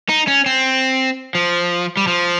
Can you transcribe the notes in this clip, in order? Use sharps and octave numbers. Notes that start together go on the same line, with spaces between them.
D#4
C#4
C4
F3
G3
F3